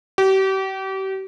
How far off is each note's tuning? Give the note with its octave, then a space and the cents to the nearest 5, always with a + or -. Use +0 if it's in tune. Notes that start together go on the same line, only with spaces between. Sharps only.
G4 -35